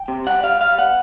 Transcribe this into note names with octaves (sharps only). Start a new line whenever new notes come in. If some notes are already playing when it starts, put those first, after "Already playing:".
Already playing: G5
C3
G3 F#5
G3 F5
G3 F5
B3 F#5